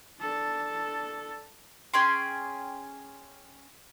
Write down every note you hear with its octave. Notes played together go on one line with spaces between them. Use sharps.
D4 A4
C#4 G#4 G5 C6